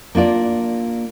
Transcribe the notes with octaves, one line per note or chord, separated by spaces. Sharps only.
A#3 D4 F4 D5